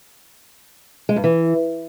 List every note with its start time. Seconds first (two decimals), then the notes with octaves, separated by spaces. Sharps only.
1.09 G#3
1.16 G2
1.24 E3